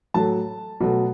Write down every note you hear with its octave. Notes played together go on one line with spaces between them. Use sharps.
A2 F#3 A3 A5
B2 F#3 A3